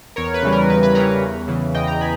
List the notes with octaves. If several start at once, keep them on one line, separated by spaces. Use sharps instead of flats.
E2 A#4 C#5
B4
C#3 E3 G3
A#4
E2 B4
B4
C#3 E3 G3 A#4 C#5
E2
C#3 E3
E2 D#5 G5
G5 A#5
G#5 B5